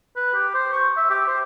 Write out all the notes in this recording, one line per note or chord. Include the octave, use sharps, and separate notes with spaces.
B4
G4
C5
C#6
E5
G4
C5